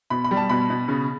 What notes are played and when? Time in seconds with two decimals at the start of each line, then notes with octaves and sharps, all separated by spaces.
0.10 B2 B5
0.24 B5
0.31 G3
0.37 A5
0.49 B2 B5
0.70 B2
0.88 C#3